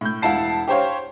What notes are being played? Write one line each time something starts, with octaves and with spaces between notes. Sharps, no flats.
A2 G6
E1 E4 F5 F#5 A5 C7
G4 C5 C#5 F5